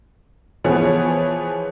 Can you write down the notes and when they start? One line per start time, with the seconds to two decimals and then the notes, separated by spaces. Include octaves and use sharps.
0.64 E3 F3 B3 G#4 C#5